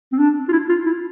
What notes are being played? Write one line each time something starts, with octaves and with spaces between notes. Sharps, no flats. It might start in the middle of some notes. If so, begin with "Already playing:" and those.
C4
D4
F4
E4
F4
E4